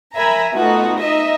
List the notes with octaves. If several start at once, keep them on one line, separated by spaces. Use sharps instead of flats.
A#4 E5 G#5 A#5 B5
B2 A3 D#4 F4 F#4 A4
D#4 D#5 E5